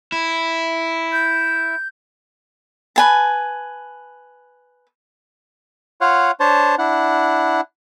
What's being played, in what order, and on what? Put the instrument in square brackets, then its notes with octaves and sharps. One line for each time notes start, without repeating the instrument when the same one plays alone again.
[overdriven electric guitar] E4
[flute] G6
[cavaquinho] B4 G#5 A5
[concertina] F4 C#5 F5 F#5
D4 C5 C#5 A5
D4 E4 F#5